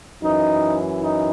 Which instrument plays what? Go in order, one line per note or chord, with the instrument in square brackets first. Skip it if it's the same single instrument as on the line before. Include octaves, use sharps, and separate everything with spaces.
[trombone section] F#2 E3 D#4
D#4